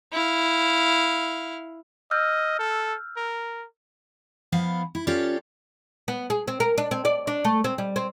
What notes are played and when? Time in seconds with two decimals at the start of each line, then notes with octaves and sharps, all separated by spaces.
0.12 E4 F5
2.11 D#5 E6 F6 G6
2.59 A4
3.17 A#4
4.52 F3 B3 E4 F5
4.95 E4
5.07 C#4 F4 G4 A4 C#5 D5
6.08 B3
6.30 G#4
6.48 C4
6.60 A#4
6.78 D4
6.91 C4
7.05 D5
7.27 D4
7.45 A3
7.64 C4
7.78 G3
7.96 C4